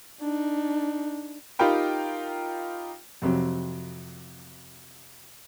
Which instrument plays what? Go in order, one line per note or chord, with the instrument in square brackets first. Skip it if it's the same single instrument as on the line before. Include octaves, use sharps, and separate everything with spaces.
[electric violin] D4 D#4
[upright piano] D#4 F4 G4 A#4 G5 B5
[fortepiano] F2 C3 F#3